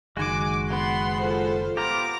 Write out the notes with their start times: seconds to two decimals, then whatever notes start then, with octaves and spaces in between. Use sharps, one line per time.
0.17 F#1 D#3 G#3 F#4 G#5 D6
0.70 B3 C6
1.18 F4 A4 C5
1.77 B3 F4 G4 A#5 D6